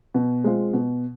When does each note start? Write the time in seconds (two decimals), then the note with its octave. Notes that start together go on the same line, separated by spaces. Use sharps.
0.14 B2
0.44 G#3 C4 F4
0.73 B2